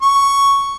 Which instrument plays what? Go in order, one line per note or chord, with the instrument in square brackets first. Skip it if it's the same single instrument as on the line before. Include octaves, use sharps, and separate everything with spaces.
[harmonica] C#6